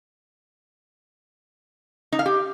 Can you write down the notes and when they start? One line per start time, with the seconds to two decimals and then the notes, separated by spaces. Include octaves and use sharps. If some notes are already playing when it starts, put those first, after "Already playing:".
2.12 D#4
2.19 F5
2.26 G4